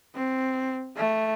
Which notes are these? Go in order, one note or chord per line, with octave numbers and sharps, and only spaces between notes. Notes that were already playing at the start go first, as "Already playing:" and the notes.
C4
A3